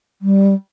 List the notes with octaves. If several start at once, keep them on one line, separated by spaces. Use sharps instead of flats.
G3